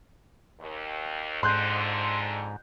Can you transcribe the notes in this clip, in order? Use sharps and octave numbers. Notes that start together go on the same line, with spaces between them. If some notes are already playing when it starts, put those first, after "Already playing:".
D#2
F2 G#2 D3 C6 F#6 G6